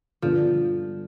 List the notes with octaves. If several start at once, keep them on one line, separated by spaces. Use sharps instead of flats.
G2 D3 F3 G3 B3 D4